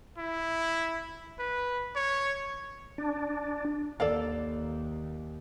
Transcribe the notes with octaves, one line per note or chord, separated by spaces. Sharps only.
E4
B4
C#5
D4
D#2 A4 D5 F5